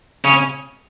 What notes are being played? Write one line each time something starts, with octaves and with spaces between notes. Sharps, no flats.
C#3 C#4